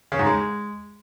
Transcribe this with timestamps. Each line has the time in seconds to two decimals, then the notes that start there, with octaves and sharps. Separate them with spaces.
0.12 C#3
0.19 G#2
0.26 G#3